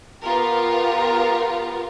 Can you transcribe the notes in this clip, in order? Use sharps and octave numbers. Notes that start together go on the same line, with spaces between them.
B3 F4 G4 A#4